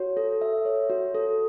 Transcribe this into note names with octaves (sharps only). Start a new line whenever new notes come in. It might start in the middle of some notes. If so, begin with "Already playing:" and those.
Already playing: F#4 C#5
A4
E5
C#5
F#4
A4